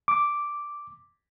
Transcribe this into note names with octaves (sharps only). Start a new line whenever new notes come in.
D6